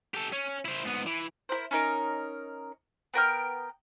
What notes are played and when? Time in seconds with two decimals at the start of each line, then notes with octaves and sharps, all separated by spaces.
0.14 G4 A4
0.32 C#4
0.65 E4 C5
0.85 G#2 B3
1.06 E3
1.49 E4 G4 A#4 C5
1.71 C#4 D#4 A#4
3.14 B3 A#4 G5 F6